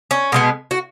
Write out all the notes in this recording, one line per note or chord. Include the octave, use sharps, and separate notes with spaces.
C#4
B2 G#3 B3
F#4